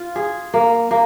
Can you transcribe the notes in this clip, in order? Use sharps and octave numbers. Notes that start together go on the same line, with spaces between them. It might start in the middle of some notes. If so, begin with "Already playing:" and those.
Already playing: F4
G#4
A#3
A#3